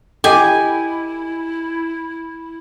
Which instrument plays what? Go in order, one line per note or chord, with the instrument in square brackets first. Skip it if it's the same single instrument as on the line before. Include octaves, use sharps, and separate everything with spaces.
[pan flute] E4 [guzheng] G4 [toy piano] A4 D#5 F#5 [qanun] G#5